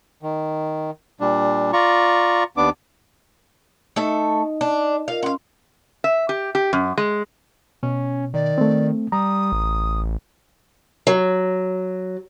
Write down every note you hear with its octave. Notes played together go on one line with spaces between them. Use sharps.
D#3
A#2 G3 D4
F4 D5 A#5 C#6
D#2 B3 D4 D6
A3 D#4 A4 D#5 E5
D4
F4 A#4 D#5 F5
C#4 F5 F#5 C6
E5
G4
G4
F#2
G#3
B2 C#4
D#3 D5
A3 C4
G3 A#5 D#6
A1
F#3